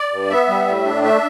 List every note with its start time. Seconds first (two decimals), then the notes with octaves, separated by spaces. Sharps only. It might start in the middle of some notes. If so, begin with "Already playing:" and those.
Already playing: D5
0.11 G2
0.30 B3 E5
0.48 G3
0.67 A2
0.85 D4
1.03 A3 E5